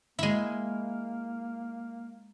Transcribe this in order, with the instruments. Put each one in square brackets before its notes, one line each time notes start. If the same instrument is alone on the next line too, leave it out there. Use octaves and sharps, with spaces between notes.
[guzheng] G#3 E4 [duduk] A#3